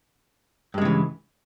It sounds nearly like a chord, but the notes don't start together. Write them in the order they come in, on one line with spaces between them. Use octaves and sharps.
G2 G#3 C#3 E3